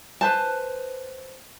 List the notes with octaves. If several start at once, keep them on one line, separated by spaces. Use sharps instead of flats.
B4 C5 A5